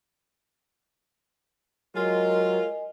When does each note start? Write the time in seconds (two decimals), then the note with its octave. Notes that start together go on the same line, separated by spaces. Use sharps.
1.96 F#3 G#3 F4 A#4 D#5 G#5